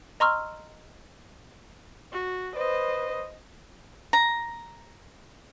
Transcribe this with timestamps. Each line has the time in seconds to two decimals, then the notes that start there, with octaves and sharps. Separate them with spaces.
0.20 D#5 A#5 C6 C#6 E6 F6
2.12 F#4
2.56 B4 C5 D#5
4.13 A#5